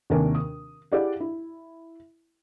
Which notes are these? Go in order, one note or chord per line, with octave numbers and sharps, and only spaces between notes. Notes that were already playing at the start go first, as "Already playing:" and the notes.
D#2 C3 C4 D4 A#4 G#5
D#6
E4 G4 G#4 D5 F5 F#5
E4